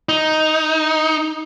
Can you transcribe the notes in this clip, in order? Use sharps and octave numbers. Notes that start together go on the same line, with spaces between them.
D#4